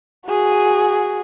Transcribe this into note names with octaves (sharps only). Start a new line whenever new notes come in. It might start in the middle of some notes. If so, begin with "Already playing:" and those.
F#4 G#4